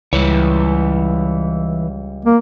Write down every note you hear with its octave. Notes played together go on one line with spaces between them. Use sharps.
C#2 E3 G3 C#5
A#3